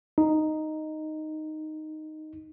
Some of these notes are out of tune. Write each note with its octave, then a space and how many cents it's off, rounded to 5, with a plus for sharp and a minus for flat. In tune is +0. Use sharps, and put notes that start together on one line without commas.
D#4 -5